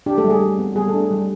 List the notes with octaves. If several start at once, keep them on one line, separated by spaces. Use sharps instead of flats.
D4 G4
A3 A4
G3
G#4
G3
B3
G3 G#4
A3 A4
D4
G#4
G3